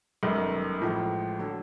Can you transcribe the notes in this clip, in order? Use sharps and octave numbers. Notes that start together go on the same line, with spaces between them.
G1 F#2 D#3
A1 A2 F3 G#3
D3 F#3